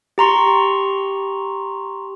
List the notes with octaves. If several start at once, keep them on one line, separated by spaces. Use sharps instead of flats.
G4 A#5 C6 C#6